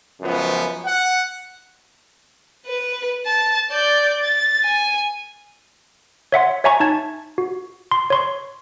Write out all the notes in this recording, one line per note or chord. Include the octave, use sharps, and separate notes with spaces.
C#2 F#2 F3 B3
F#5
B4
A5
D5 G6
A6
G#5
C#5 E5 F#5 C6
C#5 E5 G#5 A#5 C#6
D#4 A5 G#6
F#4
C6
C#5 C6 C#6